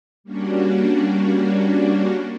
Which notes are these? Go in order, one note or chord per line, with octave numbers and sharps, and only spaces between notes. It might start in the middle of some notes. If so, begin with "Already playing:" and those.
G3 A#3 C#4 D4 F#4